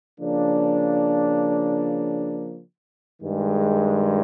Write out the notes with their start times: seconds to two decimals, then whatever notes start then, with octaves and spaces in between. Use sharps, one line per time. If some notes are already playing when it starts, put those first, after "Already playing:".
0.20 C#3 F3 A#3 D4
3.22 G2 D#3 G#3